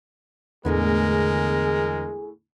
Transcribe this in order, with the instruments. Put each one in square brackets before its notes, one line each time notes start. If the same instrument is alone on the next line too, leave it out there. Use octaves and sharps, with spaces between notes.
[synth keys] E2 D3 [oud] A2 A3 B3 [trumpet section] G#3 A#4 [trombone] G#4